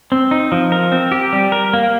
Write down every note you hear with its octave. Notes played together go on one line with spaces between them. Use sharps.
C4
D#4
F3
A#4
C4
G4
G3
A#4
A#3